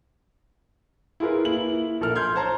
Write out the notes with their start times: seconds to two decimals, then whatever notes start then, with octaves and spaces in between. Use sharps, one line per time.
1.20 E4 F4 G#4 A#4 B4
1.45 A#3 E4 F#7
2.01 A#1 A4 A#4 F6
2.15 C6 F6 G6 G#6
2.36 C5 C#5 A5 A#5 C6